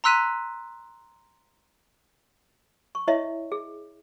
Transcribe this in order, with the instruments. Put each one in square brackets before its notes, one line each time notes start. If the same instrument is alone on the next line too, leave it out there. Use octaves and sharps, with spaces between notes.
[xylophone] A#5 C6 E6 F#6 B6 D#7
[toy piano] C#6
E4 C#5 D#5 E5
G#4